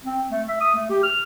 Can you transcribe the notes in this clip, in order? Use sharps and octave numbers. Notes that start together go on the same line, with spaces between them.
C4
A3
E5
D#6
A3
G4
F6